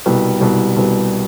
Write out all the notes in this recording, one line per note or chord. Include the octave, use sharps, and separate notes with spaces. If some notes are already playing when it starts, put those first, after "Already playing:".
C2 B2 G3
C2 B2 G3
C2 B2 G3